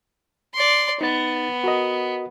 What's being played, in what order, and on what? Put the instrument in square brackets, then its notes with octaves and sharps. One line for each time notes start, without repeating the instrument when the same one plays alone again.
[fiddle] D5 C6
[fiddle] B3 [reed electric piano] D#4 A6
[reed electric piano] F#4 A#4 D#5